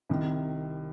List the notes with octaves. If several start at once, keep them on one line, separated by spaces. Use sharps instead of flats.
C2 C3 D#3